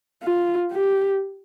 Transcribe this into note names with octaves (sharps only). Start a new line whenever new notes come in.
F4
G4